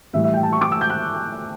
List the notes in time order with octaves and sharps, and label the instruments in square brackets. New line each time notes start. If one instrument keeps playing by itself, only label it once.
[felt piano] A2 E3 G3 E5
E5
G5
A5
C#6
D6
E6
G6
F#6